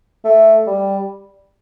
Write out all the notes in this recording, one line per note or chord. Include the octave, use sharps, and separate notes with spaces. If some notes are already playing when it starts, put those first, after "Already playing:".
A3
G3